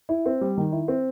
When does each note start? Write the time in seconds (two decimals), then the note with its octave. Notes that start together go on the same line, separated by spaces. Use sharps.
0.09 E4
0.26 C4
0.41 G3
0.58 D#3
0.72 E4
0.88 C4